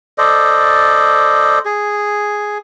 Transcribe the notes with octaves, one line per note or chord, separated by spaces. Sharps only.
A4 C5 D5 D#5
G#4